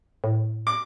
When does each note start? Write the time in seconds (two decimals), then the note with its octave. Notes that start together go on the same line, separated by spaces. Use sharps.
0.24 A2
0.67 D6